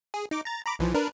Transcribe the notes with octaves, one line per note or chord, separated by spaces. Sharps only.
G#4
D#4 D6
A#5 A6
A#5 B5 D6
B1 E3 F3
D4 A#4 B4